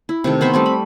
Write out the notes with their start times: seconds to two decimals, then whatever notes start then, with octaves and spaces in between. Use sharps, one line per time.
0.09 E4
0.24 C3 D#3 A3
0.41 B3 C5 B5 C#6
0.54 G3 A3 C4
0.66 B5